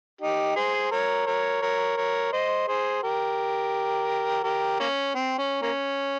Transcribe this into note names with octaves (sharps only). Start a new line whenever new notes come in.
D#4 G4
G#4 C5
A#4 C#5
A#4 C#5
A#4 C#5
A#4 C#5
C5 D#5
G#4 C5
G4 A#4
G4 A#4
A#3 C#4
C4
C#4
A#3 C#4